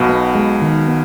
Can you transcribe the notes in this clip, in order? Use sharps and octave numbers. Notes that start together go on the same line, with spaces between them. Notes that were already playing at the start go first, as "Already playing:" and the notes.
Already playing: B1 B2
B3
G#3
D#3
B3